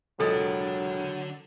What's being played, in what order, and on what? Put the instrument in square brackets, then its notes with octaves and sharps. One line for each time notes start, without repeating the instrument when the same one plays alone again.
[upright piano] E1 C#2 A6 [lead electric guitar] D3 D4 [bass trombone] F#3 [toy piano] A4 D#6